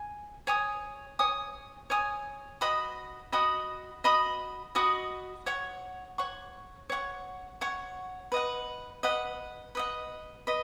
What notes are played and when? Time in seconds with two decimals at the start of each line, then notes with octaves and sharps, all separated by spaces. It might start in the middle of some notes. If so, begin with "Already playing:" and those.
Already playing: G#5
0.47 C#5 G#5 D#6
1.19 C#5 G#5 D#6
1.90 C#5 G#5 D#6
2.61 F#4 D#5 B5 D#6
3.32 F#4 D#5 B5 D#6
4.04 F#4 D#5 B5 D#6
4.75 F#4 D#5 B5 D#6
5.46 C#5 F#5 C#6
6.18 C#5 F#5 C#6
6.90 C#5 F#5 C#6
7.61 C#5 F#5 C#6
8.32 B4 D#5 F#5
9.03 B4 D#5 F#5
9.75 B4 D#5 F#5
10.47 B4 D#5